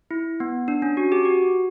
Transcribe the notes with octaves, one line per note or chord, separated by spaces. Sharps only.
E4
B3
D4
C#4
F#4
G4
F#4